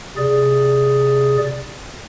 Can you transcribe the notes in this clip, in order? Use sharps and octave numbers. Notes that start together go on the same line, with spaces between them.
C3 G#4 D5